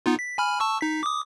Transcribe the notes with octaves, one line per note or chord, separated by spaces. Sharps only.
B3 D#4 F4
B6
G#5 B5 F6
A5 C#6 E6
D#4 B6
D6 D#6